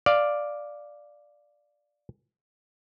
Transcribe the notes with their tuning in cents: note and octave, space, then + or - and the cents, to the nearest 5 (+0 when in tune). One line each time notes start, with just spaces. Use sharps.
D5 +0 F5 +0